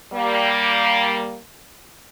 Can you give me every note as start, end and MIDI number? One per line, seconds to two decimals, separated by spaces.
0.14 1.38 55
0.14 1.38 58